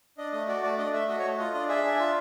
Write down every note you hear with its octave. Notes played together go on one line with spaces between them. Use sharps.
D4 D#5
A3 D#5
F#4 D5
A3 D5
D4 D#5
A3 E5
F#4 D#5
C#5
A3
F4 D#5
D4 D#5
G#4 E5
D4
F4